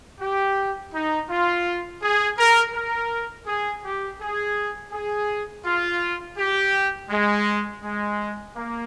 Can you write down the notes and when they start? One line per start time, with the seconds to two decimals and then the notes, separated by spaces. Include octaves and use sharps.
0.20 G4
0.94 D#4
1.29 F4
2.02 G#4
2.38 A#4
2.74 A#4
3.47 G#4
3.83 G4
4.20 G#4
4.92 G#4
5.65 F4
6.38 G4
7.10 G#3
7.83 G#3
8.55 A#3